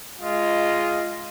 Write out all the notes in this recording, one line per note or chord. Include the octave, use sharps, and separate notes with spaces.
G#3 F4 D#5